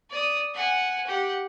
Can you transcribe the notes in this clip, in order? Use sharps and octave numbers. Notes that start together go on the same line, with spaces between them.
D5 D#6
F#5 G#5
G4 F#5